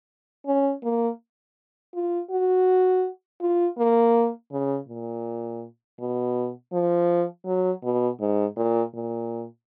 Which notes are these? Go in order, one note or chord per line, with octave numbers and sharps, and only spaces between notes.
C#4
A#3
F4
F#4
F4
A#3
C#3
A#2
B2
F3
F#3
B2
G#2
A#2
A#2